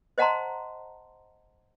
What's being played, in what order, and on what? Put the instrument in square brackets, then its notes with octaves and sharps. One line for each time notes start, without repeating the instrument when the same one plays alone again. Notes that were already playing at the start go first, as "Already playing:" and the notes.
[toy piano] C5 D#5 F#5 A5 A#5 C6